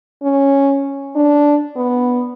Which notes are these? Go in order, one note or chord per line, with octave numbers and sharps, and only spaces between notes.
C#4
D4
B3